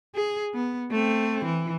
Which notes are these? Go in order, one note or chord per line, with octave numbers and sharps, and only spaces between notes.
G#4
B3
A3 C4
E3